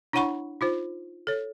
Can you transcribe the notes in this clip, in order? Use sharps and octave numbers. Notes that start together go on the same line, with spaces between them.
D4 E4 C#5 F#5 B5 C#6
D#4 F4 C5
A4 C#5